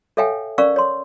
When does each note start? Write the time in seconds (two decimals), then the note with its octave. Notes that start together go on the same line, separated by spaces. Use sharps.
0.17 A4 C#5 E5 F5 G5 G#5
0.58 C#4 A#4 D5 F5 C#6 E6
0.76 C#5 C6